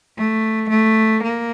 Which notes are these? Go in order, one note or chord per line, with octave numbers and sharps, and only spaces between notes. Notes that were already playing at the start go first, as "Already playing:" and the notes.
A3
A3
A#3